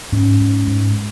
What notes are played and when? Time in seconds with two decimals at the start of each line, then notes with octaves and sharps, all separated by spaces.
0.12 G#2 C#4
0.40 G#2
0.67 G#2